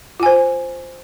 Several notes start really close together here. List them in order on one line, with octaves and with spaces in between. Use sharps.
F4 G#5 C5